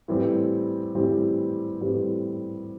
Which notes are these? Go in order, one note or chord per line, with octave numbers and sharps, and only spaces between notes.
A2 E3 G3 C4 G4
A2 E3 G3 C4 G4
A2 E3 G3 C4 G4